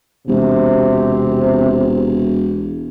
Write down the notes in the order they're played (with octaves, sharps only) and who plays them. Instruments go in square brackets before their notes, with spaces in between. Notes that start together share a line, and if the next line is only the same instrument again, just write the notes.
[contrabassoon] E1 [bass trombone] C3